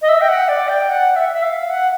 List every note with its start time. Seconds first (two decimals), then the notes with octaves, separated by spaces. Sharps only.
0.02 D#5
0.09 E5
0.21 G5
0.28 F#5
0.48 D5
0.69 G5
0.90 F#5
1.16 E5
1.32 E5
1.42 F5
1.70 F#5